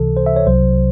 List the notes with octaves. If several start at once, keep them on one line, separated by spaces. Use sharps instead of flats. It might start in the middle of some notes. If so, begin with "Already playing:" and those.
Already playing: C#2 C3 E3 A4
C5
E5
C#5
C2 C3 F#3 C5